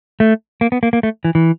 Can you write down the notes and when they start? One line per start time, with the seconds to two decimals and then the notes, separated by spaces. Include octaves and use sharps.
0.20 A3
0.61 A#3
0.72 B3
0.83 A#3
0.93 A#3
1.03 A3
1.24 E3
1.35 E3